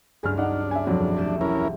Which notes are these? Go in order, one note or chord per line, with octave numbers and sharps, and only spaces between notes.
C#2 G2 F#3 G#4 F6
D4 D#4 F#5
B3 E5 G#5
E1 F2 F#3
A3 G4 E7
C#4 E4 A#4